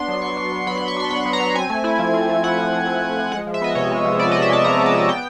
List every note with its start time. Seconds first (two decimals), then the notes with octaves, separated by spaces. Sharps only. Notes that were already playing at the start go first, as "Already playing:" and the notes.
Already playing: B3 D4 C6
0.08 F#3
0.22 F#3 C#6
0.37 D4
0.52 B3
0.67 F#3 B5
0.78 C6
0.81 F#3
0.88 C#6
0.97 D4 C6
1.11 B3 B5
1.26 F#3
1.33 A#5
1.40 F#3
1.55 C4 G#5
1.70 A3
1.84 E4
1.99 F3
2.13 C4
2.29 A3
2.44 E4 F#5
2.58 F3
2.73 C4
2.87 A3
3.02 E4
3.16 F3
3.32 G#3 F#5
3.47 F3
3.54 E5
3.62 B3 D#5
3.75 C3 C#5
3.91 G#3
4.05 F3
4.19 B3 D5
4.32 D#5
4.34 C3
4.42 E5
4.49 G#3 A5
4.64 F3 A#5
4.78 B3
4.86 A5
4.93 C3
5.09 B3 G5